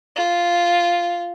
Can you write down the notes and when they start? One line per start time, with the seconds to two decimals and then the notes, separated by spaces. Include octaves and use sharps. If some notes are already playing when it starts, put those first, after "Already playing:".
0.16 F4